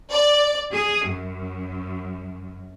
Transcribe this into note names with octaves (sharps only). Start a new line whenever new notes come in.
D5
G#4
F#2